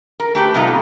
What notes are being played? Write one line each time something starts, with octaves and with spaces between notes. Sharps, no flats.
A#4
A3 G4 B4
C3 G3 B3 D#4 F4 A4
B2